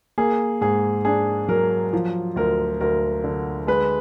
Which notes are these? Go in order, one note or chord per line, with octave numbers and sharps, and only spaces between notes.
A#3 G#4
G#2 G#4
D4 G#4
F#3 A#4
F3
D2 A#4
D2 A#4
D3
G#3 B4